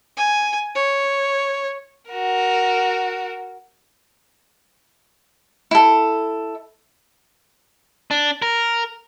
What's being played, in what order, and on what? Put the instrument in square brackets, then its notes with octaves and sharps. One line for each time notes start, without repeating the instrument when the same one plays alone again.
[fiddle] G#5
C#5
[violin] F#4 A#4
[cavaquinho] E4 A4
[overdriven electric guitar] D4
A#4